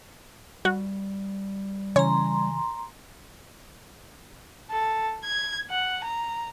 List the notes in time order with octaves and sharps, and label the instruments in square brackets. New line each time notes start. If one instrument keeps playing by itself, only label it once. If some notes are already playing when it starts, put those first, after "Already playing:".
[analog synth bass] G3 [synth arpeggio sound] F#4
[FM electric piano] C#3 E3 G#5 [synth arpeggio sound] C#5 [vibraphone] A#5 C6
[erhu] A4
G#6
F#5
A#5